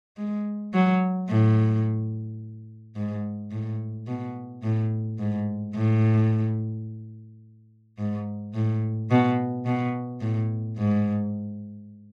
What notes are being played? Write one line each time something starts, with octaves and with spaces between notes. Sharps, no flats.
G#3
F#3
A2
G#2
A2
B2
A2
G#2
A2
G#2
A2
B2
B2
A2
G#2